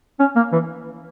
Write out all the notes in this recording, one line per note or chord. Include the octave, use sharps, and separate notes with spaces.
C#4
A#3
E3